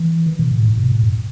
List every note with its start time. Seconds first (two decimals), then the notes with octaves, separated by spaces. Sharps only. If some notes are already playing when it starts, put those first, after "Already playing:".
Already playing: E3
0.26 D#3
0.39 B2
0.51 A2
0.65 G#2
0.77 B2
0.92 A2
1.04 F#2